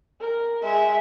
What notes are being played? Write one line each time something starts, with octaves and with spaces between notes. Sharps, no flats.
A#4
G#3 E5